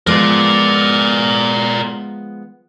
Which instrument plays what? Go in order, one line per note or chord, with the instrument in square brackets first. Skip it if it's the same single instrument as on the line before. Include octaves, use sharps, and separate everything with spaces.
[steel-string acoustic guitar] F3 G#3 B3 [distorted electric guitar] A#4 D5